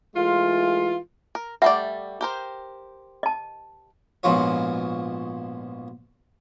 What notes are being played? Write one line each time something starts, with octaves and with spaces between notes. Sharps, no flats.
E3 G#3 A3 F4
A#4
G3 A3 D5 E5 F#5
G4 A#4 C5
D#5 A5
A#1 G#2 B2 F3 F4 C#5